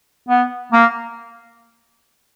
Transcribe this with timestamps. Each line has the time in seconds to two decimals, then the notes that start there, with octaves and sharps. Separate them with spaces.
0.29 B3
0.72 A#3